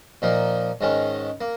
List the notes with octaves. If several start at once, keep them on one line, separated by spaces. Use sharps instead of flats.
A#2 F3 A#3 D#4
G#2 D#3 G#3 C#4
A#3